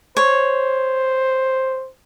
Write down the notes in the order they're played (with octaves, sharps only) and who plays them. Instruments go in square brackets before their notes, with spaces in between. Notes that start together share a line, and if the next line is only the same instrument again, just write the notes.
[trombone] C5 [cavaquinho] C#5